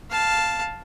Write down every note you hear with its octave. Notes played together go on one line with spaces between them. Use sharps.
F5 A5